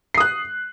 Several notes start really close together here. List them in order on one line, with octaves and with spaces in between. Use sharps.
C7 D#6 F#6